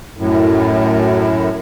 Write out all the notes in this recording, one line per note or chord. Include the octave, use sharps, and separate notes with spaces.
F#2 A2